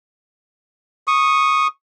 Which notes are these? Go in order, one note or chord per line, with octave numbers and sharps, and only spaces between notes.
C#6 D#6